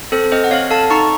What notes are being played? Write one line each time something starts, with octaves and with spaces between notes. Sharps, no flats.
C4 A4 C5
C4 C5 D#5
F#5
C4 C#5 F5
A4 F5 A5
D#4 A#5 C#6